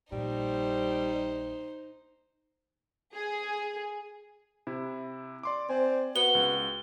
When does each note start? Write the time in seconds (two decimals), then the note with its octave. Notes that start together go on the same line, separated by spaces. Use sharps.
0.12 A#1 A#2 G3 D#4 C5
3.15 G#4
4.67 C3 E4
5.43 D5 C6 D6
5.69 C4 D5 G#5
6.16 B3 F#4 G7
6.35 C#2